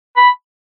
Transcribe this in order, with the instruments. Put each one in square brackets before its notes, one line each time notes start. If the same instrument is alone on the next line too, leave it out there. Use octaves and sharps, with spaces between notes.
[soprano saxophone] B5